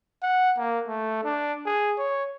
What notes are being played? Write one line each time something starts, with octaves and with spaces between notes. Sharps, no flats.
F#5
A#3
A3
D4
G#4
C#5